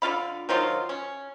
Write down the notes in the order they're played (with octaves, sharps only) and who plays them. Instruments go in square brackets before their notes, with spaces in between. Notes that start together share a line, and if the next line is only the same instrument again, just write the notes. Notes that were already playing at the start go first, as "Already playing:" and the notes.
[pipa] D3 F4 F5 B5
D#3 F3 F#3 F4
C#4